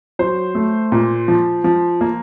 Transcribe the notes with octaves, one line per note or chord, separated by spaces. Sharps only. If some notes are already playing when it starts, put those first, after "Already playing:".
F#3 C5
A3
A#2
F3
F3
A#3